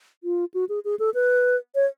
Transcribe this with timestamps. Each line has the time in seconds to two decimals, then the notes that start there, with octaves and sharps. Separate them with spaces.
0.24 F4
0.54 F#4
0.69 G#4
0.85 G#4
0.99 A4
1.14 B4
1.75 C#5